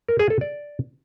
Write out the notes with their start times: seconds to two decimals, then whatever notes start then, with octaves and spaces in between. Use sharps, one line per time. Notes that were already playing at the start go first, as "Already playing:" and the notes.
0.09 A#4
0.19 G#4
0.30 A4
0.41 D5